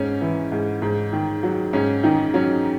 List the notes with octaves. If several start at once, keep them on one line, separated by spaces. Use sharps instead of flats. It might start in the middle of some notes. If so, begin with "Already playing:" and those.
Already playing: G#2 C#4
E3
G#2
G#2
D#3
F#3
G#2 C#4
D#3 D#4
F#3 C#4